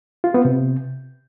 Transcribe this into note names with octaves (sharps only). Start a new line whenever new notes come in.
F4
B3
C3